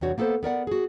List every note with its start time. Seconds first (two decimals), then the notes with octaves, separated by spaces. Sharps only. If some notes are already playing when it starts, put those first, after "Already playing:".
0.01 E2 C3 G3 D4 F#4 C#5
0.18 A#3 B3 A4 B4 C5
0.43 B3 A#4 D5 F#5
0.67 F#4 G#4